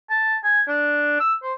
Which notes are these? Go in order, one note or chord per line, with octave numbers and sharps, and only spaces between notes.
A5
G#5
D4
E6
C5